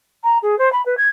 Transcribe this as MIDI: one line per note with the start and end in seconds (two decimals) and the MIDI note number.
0.24 0.38 82
0.42 0.58 68
0.58 0.71 72
0.72 0.84 83
0.86 0.95 71
0.97 1.09 92